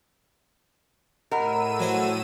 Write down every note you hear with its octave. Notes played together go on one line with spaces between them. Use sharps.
A2 A#4 D#5 F#5 B5 E6 D#7
F#3 C5